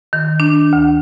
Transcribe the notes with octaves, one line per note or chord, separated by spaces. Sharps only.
D#3
D4
D2